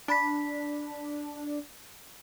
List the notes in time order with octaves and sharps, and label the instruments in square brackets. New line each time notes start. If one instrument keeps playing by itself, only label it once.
[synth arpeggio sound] D4 [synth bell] A5 B5 B6